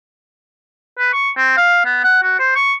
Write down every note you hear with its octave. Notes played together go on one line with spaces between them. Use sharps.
B4
C#6
C4
F5
B3
F#5
F#4
C5
C#6